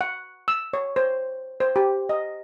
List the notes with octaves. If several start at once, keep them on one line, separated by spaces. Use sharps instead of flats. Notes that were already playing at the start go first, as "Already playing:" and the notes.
F#5
E6
C#5
C5
C5
G4
D#5